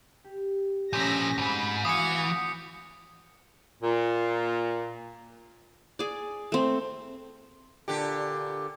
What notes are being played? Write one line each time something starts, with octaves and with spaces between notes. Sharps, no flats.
G4
A#2 F3 A3 C#4 E6 G6 A#6 B6
D#2 G#2 C4 F4 F#4 B5
E3 F#4 C#5 F5 D#6 C#7
A#2
G#4 D5
A3 C4
A#2 D3 G4